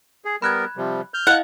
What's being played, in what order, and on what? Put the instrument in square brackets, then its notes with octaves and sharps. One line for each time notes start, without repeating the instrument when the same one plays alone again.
[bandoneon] G#4
[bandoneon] G3 B3 A#4 [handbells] B5 F#6 G#6
[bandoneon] C3 F3 G3
F6 G6
[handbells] E4 D#5 F5 [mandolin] F#5